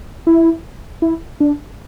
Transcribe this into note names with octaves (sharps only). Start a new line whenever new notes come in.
E4
E4
D4